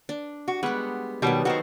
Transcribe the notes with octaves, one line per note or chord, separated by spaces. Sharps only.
D4
F#4
G3 G#3 B3 F#5
B2 D#3 F#3 G3 B3
D#3 F#4 A4 C5